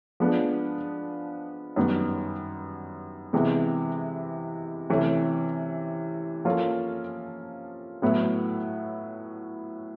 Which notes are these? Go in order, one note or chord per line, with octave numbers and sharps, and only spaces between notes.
F3 G#3 B3 D4
F#2 D#3 G3 B3
C3 E3 G#3 B3
C3 E3 A3 C#4
F3 A#3 C#4 F4 A4
A2 F#3 B3 E4